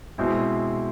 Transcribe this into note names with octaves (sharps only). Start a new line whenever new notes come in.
B2 G#3 C4 E4